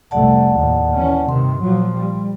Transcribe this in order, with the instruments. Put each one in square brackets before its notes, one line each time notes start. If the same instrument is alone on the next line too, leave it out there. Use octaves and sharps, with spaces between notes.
[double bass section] F1 C2 A3 [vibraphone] D5 F#5 A5
[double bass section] D#2 A2
E3 C#4
[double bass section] G2 C3 D#3 [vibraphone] C6
[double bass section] A#2 F3 F#3
G3